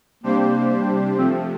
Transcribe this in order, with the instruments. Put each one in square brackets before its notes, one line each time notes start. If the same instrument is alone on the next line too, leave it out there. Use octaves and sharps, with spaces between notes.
[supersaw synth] C3 G3 D4 G4 C5 [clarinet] A#3
[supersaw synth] C3 F3 A3 [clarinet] C4